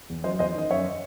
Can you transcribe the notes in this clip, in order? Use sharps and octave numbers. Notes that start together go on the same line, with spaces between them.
E2
F#3 C5 D#5
E2 C5 D#5
D#3 D#5
F#2 C#5 E5